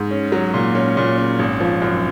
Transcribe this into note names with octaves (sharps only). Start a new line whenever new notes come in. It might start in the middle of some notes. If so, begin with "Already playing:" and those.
Already playing: G#2
C#4
F#3
A#2
C#4
A#2
C#4
G#1
F3
F#2